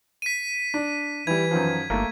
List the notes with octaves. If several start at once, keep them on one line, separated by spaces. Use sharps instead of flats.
B6 D#7
D4
E3 G3 E4 G#6
F#2 D#3 F3
G1 A3 A#3